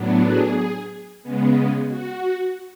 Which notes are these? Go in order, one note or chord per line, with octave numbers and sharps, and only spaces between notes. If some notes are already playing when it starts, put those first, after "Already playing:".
Already playing: A2 F#3 B3 D4
G#4
C#3 G#3 B3
F#4